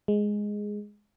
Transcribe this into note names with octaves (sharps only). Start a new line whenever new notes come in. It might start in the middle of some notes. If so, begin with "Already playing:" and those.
G#3